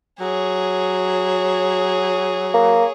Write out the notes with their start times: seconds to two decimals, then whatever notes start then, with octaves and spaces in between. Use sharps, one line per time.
0.21 F#3 G#4 C#5
2.54 A#3